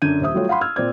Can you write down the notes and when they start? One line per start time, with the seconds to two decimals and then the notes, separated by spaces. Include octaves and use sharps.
0.02 F#2 D3 D4 G6 G#6 D#7
0.21 D#1 C5 E5 D#6
0.34 F#3 G3 A3 F4 F#4 C#5
0.49 F5 F#5 B5 C6
0.61 E6 F6 G#6
0.76 A#2 C4 D5 G#6